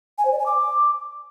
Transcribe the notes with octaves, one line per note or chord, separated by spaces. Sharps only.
G#5
C5
D5
G#5
D6